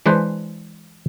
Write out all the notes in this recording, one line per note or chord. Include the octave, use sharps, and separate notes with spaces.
E3 G#3 D4 B4 C5